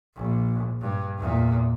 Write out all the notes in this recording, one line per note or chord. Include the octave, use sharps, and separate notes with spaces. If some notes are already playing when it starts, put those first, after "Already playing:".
A#1
G2
E2 A#2